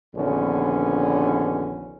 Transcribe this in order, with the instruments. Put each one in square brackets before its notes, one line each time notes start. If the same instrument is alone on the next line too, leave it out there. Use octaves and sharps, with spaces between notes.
[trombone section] A#1 D#2 D3 B3 C#4